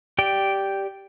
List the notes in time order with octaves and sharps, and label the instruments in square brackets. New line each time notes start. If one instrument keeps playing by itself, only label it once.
[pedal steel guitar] G4 D5 G5